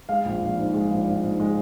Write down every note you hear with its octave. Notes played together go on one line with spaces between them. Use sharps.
G#3 F5
A#1
A#1
G#2
G#3
A#1
A#1
G#2
G#3